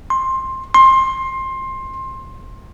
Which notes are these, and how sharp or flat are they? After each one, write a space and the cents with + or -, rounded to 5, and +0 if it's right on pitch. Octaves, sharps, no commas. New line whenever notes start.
C6 +15
C6 +20